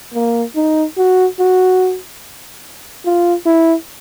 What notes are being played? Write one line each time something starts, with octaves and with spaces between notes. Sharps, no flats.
A#3
D#4
F#4
F#4
F4
E4